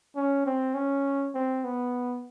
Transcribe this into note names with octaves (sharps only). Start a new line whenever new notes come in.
C#4
C4
C#4
C4
B3